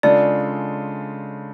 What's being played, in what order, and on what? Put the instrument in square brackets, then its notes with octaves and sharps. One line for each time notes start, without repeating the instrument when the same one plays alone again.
[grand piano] C#3 G#3 D4 F4 A4 [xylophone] D5